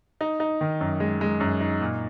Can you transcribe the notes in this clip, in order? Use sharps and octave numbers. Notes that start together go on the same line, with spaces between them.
D#4
D#4
D#3
F#2
G#3
G#3
F#2
D#4
A#2